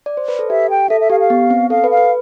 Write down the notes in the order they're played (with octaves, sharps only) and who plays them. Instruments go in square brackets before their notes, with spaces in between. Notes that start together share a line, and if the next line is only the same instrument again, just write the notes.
[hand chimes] D5
C5
B4
A4
[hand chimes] G4 [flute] E5
[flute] G5
[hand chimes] A4 [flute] E5
[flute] E5
[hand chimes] G4 [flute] F5
[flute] F5
[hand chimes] B3
C4
[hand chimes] A4 [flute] F5
[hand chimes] B4
[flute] F5
[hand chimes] B4